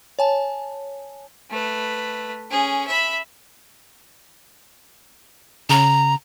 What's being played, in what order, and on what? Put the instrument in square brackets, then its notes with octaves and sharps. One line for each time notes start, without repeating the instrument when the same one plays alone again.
[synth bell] C#5 G#5 A5
[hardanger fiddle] A3 B4
C#4 G#4
E5 B5
[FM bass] C#3 [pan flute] A#5